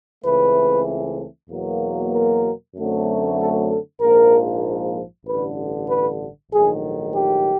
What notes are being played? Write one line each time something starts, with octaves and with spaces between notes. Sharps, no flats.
C#2 C#3 E3 A3 C4 B4
E2 B2 F#3 A#3
A#4
F#2 D3 F#3 A3 C4
A4
A4
A#1 G#2 F3 A#3 A#4
A1 G2 D3 B4
B4
A#1 G#2 D#3 F#3 A3 G#4
G4